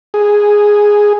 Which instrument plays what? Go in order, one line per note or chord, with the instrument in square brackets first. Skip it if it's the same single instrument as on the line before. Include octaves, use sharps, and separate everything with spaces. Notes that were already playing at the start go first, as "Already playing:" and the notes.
[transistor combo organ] G#4